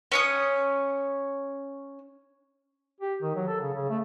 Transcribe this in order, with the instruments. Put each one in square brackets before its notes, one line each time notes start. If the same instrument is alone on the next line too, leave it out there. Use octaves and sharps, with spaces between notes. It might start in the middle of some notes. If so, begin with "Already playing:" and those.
[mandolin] C#4 C#5 D#6
[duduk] G4
D#3
F#3
A4
C#3
C#3
A3